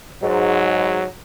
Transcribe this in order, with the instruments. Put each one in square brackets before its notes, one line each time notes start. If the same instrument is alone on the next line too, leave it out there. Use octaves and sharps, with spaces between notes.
[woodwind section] G#2 [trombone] F#3